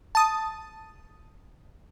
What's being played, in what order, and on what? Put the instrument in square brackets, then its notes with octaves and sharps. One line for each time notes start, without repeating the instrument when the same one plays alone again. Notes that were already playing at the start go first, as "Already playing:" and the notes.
[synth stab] A5 D#6